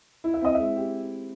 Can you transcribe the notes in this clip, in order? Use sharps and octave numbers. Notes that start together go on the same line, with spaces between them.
E4
E5
C4 D#5
G#3 E5
G4